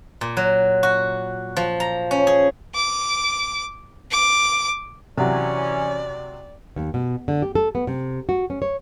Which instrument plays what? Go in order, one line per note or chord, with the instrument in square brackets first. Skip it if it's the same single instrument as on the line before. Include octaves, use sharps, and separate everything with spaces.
[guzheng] A#2
F#3
F#4
F3
A#5
C#4
G#4
[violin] D6
D6
[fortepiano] C3 F#3 [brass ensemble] E3 C#4 [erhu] D5
[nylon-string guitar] D#2
B2
D3
G4
A4
B3
C3
F#4
C#4
C#5